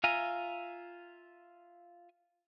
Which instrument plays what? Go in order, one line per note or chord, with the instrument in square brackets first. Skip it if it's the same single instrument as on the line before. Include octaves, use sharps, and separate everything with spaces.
[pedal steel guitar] F4 E5 F5 G#5 A#5